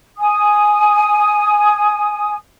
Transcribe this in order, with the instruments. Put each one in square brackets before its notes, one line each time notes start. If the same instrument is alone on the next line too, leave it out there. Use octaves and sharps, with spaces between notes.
[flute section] G#5 D#6